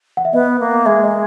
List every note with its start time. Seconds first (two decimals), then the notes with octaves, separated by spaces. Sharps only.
0.17 F#5
0.25 E5
0.33 B3 D#5
0.60 A#3
0.86 G#3 E5
1.04 D#5